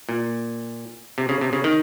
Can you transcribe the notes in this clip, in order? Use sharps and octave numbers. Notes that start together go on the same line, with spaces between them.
A#2
C3
C#3
C3
C#3
D#3